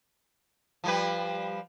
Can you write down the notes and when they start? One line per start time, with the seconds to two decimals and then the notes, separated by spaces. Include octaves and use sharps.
0.84 F3 G3 B4